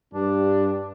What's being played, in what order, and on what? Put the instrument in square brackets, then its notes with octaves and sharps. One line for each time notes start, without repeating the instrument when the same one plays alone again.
[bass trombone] G2 [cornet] D4